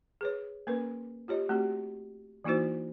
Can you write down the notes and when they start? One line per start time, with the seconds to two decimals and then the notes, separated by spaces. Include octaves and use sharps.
0.21 G#4 B4 C#5
0.67 A#3 C#4 A#4 B4
1.28 F4 G4 C#5 D#5
1.49 A3 C4 F#4 G4
2.44 E3 A#3 D#4 E4 F#4 C5